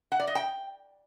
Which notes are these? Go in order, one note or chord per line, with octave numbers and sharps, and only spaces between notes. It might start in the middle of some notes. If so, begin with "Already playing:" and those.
F#5
D5
D#5
G5